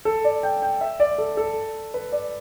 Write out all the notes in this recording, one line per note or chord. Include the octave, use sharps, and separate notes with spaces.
A4
D5
G5
G5
E5
D5
A4
A4
B4
D5